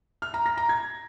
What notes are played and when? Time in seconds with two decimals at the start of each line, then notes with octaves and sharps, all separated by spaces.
0.22 F6
0.34 A#5
0.46 A#6
0.57 A#5
0.69 G#6